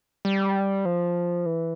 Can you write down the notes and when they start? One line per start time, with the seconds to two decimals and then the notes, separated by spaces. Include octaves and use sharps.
0.25 G3
0.85 F3
1.46 E3